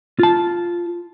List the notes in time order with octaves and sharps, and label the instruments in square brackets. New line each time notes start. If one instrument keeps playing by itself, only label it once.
[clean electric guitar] F4 A5